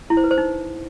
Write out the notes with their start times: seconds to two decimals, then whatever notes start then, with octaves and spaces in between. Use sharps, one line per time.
0.10 E4
0.17 C5
0.24 B4
0.31 C5
0.38 D#4